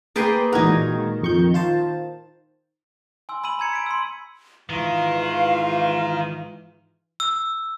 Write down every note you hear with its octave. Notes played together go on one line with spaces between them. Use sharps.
A#3 G#4 B4 D5 G5 C6
A#2 E3 G#3 D#4 F#4 A#4 G#6
D#3
F2 C#6 G6
F4 C5 A5
G#5 C6 E6
B5 E6 D#7 F#7
A#5 E6 G#6 C#7
B6 D7
C6 E6
G#2 D#3 E3 F4 F5
E6